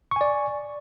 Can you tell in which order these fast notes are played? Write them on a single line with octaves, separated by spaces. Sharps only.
C#6 G#5 D5